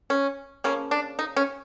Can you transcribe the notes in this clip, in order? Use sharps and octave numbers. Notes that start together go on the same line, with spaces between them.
C#4
C#3 F3 A#3 C#4
D4
D#4
C#4